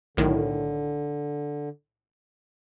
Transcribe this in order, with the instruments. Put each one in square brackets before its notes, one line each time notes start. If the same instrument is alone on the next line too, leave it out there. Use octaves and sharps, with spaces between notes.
[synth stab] B1 A2 D#3 [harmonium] D3